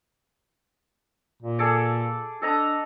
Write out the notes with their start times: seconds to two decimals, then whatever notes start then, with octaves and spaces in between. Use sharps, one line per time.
1.42 A#2
1.59 G#4 A4 D5
2.42 D4 A4 D#5 A#5